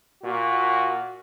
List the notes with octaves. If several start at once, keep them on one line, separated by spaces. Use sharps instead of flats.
A#2 F#4